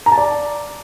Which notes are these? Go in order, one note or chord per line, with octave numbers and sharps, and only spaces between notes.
A#5
A5
D5